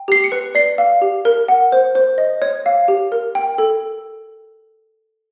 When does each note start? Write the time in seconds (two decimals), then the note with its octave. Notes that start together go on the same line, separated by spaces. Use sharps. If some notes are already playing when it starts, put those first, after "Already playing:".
Already playing: G5
0.08 G4 C7
0.24 C#7
0.32 B4
0.55 D5 C7
0.78 F5
1.02 G4
1.25 A#4
1.48 F#5
1.72 C5
1.95 C5
2.18 D#5
2.42 C#5
2.66 F5
2.88 G4
3.12 A#4
3.35 G5
3.58 A4